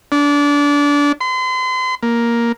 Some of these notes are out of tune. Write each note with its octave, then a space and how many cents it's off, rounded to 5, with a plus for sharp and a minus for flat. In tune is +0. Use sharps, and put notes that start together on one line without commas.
D4 -25
C6 -40
A#3 +5